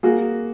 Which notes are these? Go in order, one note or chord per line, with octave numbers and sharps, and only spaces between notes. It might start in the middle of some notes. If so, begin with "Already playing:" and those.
A#3 F#4 G#4